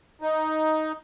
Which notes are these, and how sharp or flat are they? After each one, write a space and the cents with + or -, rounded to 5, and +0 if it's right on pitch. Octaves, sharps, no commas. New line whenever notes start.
D#4 +5